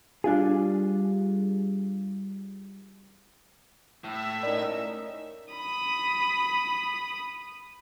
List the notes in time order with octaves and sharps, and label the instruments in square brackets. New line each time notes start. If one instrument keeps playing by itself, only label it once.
[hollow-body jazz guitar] G3 D4 F4 G#4
[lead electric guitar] A2 [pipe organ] E5
[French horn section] C#4 D#4 A#4 [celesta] D5
[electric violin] B5 D#6